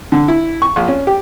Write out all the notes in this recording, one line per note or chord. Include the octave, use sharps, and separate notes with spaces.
D3
E4
C#6
A#1
C#4
G4